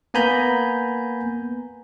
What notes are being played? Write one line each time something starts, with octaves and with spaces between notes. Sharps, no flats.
A#3 B3 G#5 A#5 B5 G6